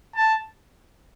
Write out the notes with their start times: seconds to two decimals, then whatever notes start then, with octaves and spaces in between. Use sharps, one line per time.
0.15 A5